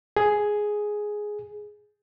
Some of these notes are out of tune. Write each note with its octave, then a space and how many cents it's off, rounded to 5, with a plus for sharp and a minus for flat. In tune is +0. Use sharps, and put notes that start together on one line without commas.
G#4 +5